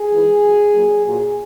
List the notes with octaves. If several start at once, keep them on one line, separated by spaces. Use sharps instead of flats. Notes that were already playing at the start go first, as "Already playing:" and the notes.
Already playing: G#4
G#2 E3
F#2 C#3 F#3
A#2 F#3
A#2 F#3 G#4